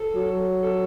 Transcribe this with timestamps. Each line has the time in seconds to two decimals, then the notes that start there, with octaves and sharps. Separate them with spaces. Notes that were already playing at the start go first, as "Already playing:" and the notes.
Already playing: A4
0.15 F#3
0.62 A4